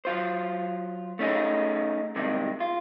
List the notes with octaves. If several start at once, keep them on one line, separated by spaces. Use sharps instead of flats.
F#3 F4 C5
A3 C#4 D#4 G#4
G2 C3 D#3 G#3
F4